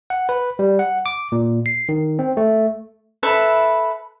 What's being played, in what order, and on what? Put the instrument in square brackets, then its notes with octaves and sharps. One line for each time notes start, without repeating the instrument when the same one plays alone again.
[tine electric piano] F#5
B4
G3
F#5
D6
A#2
C7
D#3
C4
A3
[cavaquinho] A4 B4 E5 B5